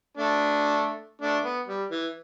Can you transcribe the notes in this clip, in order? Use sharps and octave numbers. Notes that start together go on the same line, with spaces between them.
A3 D4
A3 D4
B3
G3
E3